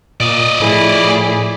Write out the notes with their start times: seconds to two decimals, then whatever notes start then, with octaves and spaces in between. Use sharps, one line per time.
0.20 A#2 D5 D#5
0.60 A2 F3 E4 G#4